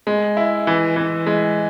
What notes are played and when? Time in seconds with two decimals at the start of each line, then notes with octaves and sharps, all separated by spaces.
0.07 G#3
0.37 E4
0.67 E3
0.96 E3
1.27 G#3